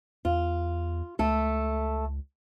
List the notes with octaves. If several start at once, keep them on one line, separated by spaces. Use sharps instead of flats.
E2 F4
C#2 A3 A4